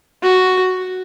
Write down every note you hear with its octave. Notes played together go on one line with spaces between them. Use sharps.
F#4